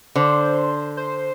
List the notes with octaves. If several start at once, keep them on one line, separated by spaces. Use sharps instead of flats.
D3 C5
C5